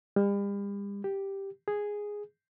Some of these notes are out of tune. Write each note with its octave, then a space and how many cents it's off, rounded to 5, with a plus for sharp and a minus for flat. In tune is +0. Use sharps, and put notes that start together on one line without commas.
G3 +40
G4 +0
G#4 -5